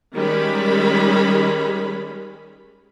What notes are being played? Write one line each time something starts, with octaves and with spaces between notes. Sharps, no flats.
D#3 G3 G#3 C#4 B5